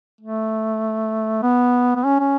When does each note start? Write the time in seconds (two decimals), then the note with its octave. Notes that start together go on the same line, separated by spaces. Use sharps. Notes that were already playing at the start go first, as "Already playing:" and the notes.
0.21 A3
1.42 B3
1.96 B3
2.04 C#4
2.20 C#4